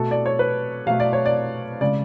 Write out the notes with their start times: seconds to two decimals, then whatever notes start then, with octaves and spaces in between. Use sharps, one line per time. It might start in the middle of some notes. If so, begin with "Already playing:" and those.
Already playing: B2 A3 A4
0.11 D5
0.26 C#5
0.39 B4
0.87 B2 A3 F5
1.00 D5
1.13 C#5
1.26 D5
1.81 C#3 G#3 D5